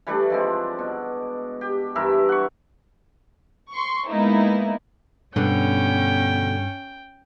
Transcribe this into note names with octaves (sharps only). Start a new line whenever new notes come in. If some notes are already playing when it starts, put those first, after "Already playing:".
E3 G3 A3 D4
F3 G#3 C4
B2
G4
G2 E3 A#4 E5
F#5 C#6
C6 C#6
G#3 A#3 B3 D#4 E4
G2 B2 D3 B3 C#4 G5